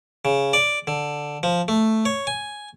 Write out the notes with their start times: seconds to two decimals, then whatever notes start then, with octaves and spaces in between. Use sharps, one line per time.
0.25 C#3
0.53 D5
0.87 D3
1.43 F3
1.68 A3
2.05 C#5
2.27 G#5